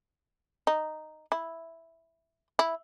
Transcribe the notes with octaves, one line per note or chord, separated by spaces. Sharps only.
D#4
E4
E4